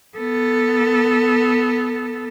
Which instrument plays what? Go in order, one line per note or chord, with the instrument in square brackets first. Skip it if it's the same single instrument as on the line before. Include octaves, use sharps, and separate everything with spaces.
[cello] B3 A4